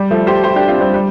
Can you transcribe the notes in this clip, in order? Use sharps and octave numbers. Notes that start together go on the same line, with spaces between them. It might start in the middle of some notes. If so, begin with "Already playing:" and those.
Already playing: G3
F3 A3
G4 C5
G4 C5
D4 G4
C4 F4
G3 C4
G3